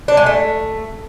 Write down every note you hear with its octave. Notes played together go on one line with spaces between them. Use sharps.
D4
G#3
A3